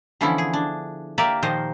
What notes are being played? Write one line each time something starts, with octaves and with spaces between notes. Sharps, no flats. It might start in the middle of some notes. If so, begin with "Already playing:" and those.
D3 E3 F3 B3 C#4 E4
G#4
D4
A#3 G4 A#4 D5 E5
A#2 D#3 F3 C5 D#5